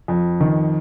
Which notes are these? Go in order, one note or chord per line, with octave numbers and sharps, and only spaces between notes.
F2
D#3